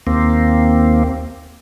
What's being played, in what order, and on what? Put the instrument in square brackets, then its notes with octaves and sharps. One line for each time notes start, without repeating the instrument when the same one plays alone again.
[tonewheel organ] D#2 A#3 C4